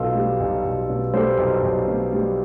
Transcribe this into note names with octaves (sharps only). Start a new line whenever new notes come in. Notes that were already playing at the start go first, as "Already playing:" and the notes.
Already playing: B1 B2 F4 A4
G3
B1
B1
B2
G3 A4 C5
B1
B1
B2
G3